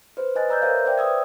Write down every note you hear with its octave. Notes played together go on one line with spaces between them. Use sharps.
B4 C5
B4 D#5 G#5 F#6 A6
B4 D5 A#5 E6 F#6 G6
A#4 C5 C#5 E5 F5
C5 D5 E5 G5
B4 D#6 E6 G#6